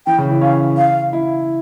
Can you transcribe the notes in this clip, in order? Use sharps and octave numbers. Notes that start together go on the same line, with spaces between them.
E3 G5
C#3
E3
C#4 F5
F5
E4